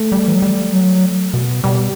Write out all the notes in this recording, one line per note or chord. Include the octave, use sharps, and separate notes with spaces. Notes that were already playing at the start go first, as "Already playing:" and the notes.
Already playing: A3
G3
E3
F#3
G3
F#3
B2
B2 G3